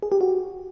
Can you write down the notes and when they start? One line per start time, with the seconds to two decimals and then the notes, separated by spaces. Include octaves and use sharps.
0.03 G#4
0.12 G4
0.21 F#4